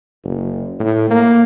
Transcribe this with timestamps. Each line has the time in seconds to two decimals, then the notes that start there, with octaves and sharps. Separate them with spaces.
0.24 F#1
0.80 A2
1.10 A#3